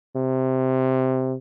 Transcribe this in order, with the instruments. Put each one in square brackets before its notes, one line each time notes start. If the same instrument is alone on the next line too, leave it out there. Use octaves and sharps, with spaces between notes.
[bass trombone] C3